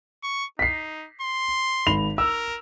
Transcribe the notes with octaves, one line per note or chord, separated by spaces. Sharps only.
C#6
D#4 B6 C7
C6
G#1 B5 F7
A#4 E6